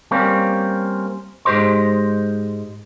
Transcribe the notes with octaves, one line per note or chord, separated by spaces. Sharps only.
G3 A#3 C4 C#4
G#2 G#3 G4 C5 D#5 C6